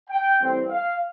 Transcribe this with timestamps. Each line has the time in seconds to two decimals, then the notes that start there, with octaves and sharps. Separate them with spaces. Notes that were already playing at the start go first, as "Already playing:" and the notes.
0.10 G5
0.40 A2 E3 G3 C4
0.69 F5